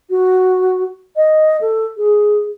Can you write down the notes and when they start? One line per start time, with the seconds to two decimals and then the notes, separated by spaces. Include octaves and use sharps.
0.10 F#4
1.16 D#5
1.61 A4
1.97 G#4